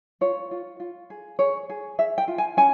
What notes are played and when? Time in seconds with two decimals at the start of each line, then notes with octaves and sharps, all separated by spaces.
0.21 F4 C#5
0.51 F4
0.80 F4
1.10 G#4
1.39 G#4 C#5
1.69 G#4
1.98 G#4 E5
2.18 G5
2.28 F4
2.38 G#5
2.57 C#4 G#5